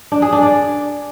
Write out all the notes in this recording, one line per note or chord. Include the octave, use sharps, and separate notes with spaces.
D4
G#4
D4
D5